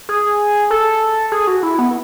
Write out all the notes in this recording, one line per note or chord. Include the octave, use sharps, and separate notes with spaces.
G#4
A4
G#4
F#4
E4
B3